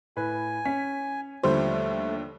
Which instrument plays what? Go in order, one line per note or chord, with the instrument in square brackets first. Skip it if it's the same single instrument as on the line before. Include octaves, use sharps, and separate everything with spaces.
[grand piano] A2 B4 [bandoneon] G#5
[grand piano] C#4 [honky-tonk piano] B6
[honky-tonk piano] D#2 D3 F3 [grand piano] G3 [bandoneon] A3 [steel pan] C5